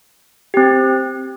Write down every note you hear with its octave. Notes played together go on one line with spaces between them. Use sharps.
C4 G4